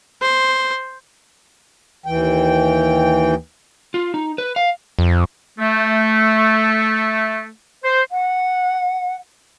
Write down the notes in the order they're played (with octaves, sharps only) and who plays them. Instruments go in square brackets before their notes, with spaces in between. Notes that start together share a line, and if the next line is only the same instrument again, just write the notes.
[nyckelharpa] C5
[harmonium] D#2 E3 G5
[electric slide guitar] F4
D#4
B4
F5
[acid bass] F2
[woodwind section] A3
C5
[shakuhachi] F#5